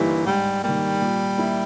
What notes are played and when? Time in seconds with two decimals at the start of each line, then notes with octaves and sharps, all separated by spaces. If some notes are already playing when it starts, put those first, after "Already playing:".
Already playing: G1 G2 E3 G3 A#3 D#4
0.26 G#2 G3
0.63 D#3 G3 A#3
1.01 A#2
1.38 A#3 E4